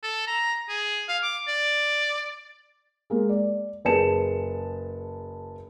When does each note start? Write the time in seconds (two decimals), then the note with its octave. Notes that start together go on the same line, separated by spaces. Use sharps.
0.03 A4
0.27 A#5
0.69 G#4
1.08 F5
1.23 D6
1.48 D5
3.10 G#3 A#3
3.29 D5
3.85 F#1 G#4 B4 A5 C#7 E7